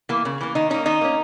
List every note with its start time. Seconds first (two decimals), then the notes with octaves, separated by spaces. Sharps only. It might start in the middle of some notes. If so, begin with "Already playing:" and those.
0.09 E3 A#3
0.25 C#3
0.41 E3 A#3
0.55 D#3 D#4
0.70 A#3 C#4 D#4
0.86 D#3 D#4
1.01 A#3 C#4